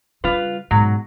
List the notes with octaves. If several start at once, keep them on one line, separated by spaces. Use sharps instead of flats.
C#3 G3 F4 B4
G#2 B2 F#3